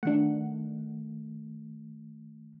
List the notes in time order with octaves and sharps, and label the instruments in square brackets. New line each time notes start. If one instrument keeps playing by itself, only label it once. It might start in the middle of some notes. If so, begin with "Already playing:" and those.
[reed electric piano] D#3 A3 [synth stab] D4 F#5